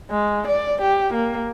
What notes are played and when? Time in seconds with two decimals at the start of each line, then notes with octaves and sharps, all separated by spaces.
0.11 G#3
0.47 D5
0.82 G4
1.13 A#3